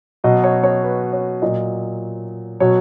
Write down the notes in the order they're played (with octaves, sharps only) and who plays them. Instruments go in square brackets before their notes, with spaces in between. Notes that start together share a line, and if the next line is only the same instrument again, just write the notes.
[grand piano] B2 F#3 D#5
C#5
C#5
B4
C#5
A#2 F#3 D#5
B2 F#3 C#5